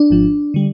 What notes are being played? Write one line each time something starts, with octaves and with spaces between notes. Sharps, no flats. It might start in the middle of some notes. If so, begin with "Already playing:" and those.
Already playing: D4
G#1 G#2 F3
D3 G3